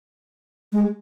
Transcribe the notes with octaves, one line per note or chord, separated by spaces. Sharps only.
G#3